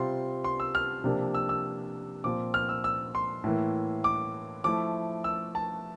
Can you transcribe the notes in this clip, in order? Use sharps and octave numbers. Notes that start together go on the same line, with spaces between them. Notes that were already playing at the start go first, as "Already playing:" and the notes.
Already playing: C3 G3 C4 F4 C6
C6
E6
F6
C3 F3 A#3 D4
E6
E6
A#2 F3 C4 F4 D6
F6
E6
E6
C6
A2 E3 A#3
D6
F3 A3 E4 D6
E6
A5